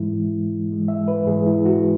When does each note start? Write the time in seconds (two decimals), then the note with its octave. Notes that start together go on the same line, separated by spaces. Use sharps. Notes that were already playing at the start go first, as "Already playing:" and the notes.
Already playing: G#2 E3 G#3 E4
0.10 G#2 E3 G#3
0.68 G#2 E3 G#3
0.88 E5
1.08 B4
1.26 G#2 E3 G#3 G#4
1.46 E4
1.66 F#4